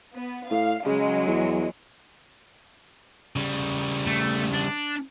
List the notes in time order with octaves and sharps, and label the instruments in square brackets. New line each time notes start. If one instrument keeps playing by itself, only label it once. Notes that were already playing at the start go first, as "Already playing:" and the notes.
[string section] B3
[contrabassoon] A2 [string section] F5
[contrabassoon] C#3 [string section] F#3 G#3
[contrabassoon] E2
[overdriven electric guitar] C#3 G3
[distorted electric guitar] A3
D4